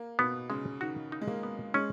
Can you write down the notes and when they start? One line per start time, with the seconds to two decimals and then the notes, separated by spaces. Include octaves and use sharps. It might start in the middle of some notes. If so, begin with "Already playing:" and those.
Already playing: A#3
0.19 B2 B3
0.50 C#3 G#3
0.81 D#3 F#4
1.12 D#4
1.21 G#3
1.27 A#3
1.43 B3
1.74 G#3 C#4